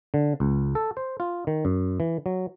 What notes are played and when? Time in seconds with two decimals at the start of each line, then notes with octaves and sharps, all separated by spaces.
0.14 D3
0.40 C#2
0.75 A4
0.97 C5
1.20 F4
1.47 D#3
1.65 F#2
2.00 E3
2.26 F#3